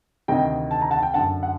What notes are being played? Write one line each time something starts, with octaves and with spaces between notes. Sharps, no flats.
D2 C3 D#3 D#5 G5
A5
A#5
F#5 A5
G5
F#2 D3 F#5 A5
F#5